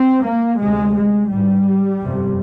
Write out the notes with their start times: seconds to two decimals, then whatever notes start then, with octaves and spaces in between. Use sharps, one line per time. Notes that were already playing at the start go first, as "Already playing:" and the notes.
Already playing: C4
0.25 A#3
0.60 D2 C3 G#3
0.96 G#3
1.31 G#1 G#2 G3
2.02 G1 F2 C3